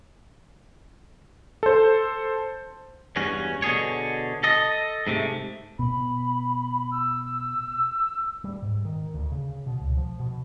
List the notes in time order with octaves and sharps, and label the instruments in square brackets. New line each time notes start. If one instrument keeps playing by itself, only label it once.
[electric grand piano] A4 C5
[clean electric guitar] E2 G2 C#4 F#4
B2 D3 G#4 C#5
A4 D#5
G#2 C3 A3
[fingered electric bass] B2 [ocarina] B5
[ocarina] E6
[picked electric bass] G3
G#2
D#3
D2
C#3
B2
C#2
F3
B2